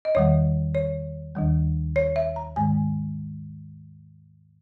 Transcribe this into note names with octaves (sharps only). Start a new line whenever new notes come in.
D#5
E2 D#3 G3 C#5
C#5
D#2 D#3 G3
C#5
E5
A#5
G#2 D#3 G#3 G#5